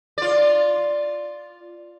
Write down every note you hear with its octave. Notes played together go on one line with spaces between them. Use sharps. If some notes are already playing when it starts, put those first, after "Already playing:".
F4 D5